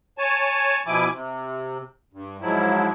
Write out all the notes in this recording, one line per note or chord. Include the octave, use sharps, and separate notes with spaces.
C#5 G#5 A5
B2 F3 E4 G#5 D6
C3
G2
G#2 F3 F#3 E4